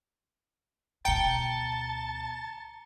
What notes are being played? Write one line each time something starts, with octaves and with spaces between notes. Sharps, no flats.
D2 B2 G5 A5 A#5 C#7 G7